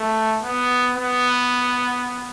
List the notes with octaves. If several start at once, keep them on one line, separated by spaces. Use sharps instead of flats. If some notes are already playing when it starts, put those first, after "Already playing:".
Already playing: A3
B3
B3